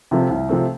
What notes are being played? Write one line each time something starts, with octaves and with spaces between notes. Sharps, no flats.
C3 F3 A3 C4
C2
C3 F3 A3 C4